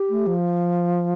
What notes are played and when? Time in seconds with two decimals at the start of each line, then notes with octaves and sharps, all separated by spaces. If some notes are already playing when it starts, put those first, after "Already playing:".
Already playing: G4
0.10 A3
0.27 F3